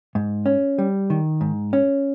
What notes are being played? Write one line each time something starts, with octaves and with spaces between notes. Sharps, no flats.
G#2
C#4
G3
D#3
G#2
C#4